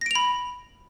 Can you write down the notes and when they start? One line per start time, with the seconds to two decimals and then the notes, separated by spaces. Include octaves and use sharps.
0.01 A#6
0.06 D7
0.11 F7
0.15 B5